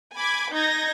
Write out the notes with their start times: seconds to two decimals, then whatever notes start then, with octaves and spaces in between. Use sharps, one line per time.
0.14 G#5 B5 D6 G#6
0.51 D#4 G6 G#6 A#6